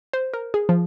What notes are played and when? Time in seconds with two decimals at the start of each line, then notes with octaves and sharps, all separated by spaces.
0.13 C5
0.34 A#4
0.54 G#4
0.69 F3